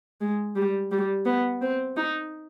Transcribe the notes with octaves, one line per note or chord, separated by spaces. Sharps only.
G#3
G3
G3
B3
C4
D#4